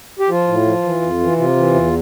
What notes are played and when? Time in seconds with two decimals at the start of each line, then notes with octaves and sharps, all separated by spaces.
0.19 G4
0.29 F3 F4
0.48 A2
0.65 F3
0.83 E3
1.02 F2
1.20 E3
1.38 C3 F4
1.56 E3
1.74 E2